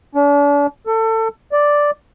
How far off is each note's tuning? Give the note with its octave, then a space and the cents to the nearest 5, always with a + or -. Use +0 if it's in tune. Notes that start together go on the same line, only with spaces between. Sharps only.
D4 -40
A4 +25
D5 +0